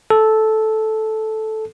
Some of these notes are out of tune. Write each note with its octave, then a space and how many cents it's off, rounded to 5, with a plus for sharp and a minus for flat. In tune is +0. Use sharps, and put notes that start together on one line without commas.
A4 -10